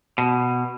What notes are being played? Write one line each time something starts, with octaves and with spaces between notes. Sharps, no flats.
B2